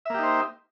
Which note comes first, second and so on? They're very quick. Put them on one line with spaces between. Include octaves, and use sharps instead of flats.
E5 A#3 G4 D#4 C5